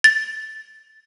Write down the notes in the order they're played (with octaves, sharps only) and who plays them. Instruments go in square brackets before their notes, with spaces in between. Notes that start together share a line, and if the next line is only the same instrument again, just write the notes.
[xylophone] A6